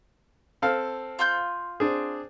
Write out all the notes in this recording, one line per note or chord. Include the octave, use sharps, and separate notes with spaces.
C4 A4 F5
F4 C6 G6
C4 D4 G#4